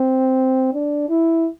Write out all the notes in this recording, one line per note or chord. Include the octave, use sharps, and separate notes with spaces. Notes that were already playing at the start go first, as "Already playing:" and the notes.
Already playing: C4
D4
E4